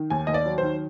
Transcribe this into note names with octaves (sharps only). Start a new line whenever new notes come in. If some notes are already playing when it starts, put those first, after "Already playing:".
Already playing: D#3
D#2 G#5
D#2 D#5
D5
F#3
D#3 C5